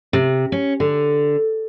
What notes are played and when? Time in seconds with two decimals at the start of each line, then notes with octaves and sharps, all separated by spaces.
0.13 C3
0.52 C#4
0.80 D3